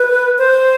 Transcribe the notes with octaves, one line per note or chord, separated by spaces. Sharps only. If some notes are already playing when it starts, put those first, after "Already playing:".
Already playing: B4
C5